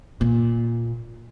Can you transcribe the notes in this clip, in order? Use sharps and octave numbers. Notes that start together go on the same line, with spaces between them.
A#2